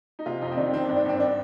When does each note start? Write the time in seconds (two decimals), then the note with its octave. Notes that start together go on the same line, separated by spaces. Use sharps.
0.19 D#4
0.26 C3 F4
0.41 F2 D#4
0.51 C4
0.57 D#3 D4
0.73 D#3 C4
0.85 D4
0.88 G2
0.96 D4
1.05 G#1 C4
1.20 D4